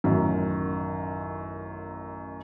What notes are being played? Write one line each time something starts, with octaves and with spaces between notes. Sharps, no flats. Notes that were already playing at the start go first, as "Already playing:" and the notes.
A1 F#2 D#3